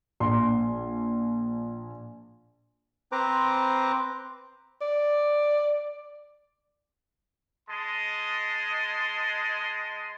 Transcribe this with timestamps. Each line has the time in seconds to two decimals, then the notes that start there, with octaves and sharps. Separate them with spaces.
0.20 A#1 C6
3.12 C4 B4 C5 A#5 D6
4.81 D5
7.69 G#3 D#5 A5 C6